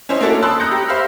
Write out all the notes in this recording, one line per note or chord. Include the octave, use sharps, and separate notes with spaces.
C#4 E4 C5 C#5 D#5
A#3 C#4 D4 E4 F#4 A4
A5 B5 C6 D#6 E6 F#6
A#5 D#6 F#6 G6 A#6 C#7
G4
C5 E5 F5 B5 E6 F6